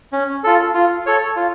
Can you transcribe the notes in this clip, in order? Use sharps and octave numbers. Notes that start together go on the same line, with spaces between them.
C#4
F4 A4
F4
A4 C#5
F4